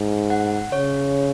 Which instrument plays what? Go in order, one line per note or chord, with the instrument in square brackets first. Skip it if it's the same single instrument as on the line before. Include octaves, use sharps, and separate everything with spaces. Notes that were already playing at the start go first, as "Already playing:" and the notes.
Already playing: [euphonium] G#2
[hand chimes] F#5
[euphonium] C#3 [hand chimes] C#5